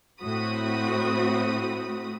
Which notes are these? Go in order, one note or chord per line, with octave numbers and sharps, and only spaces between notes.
A2 C4 F#4 B5 D#6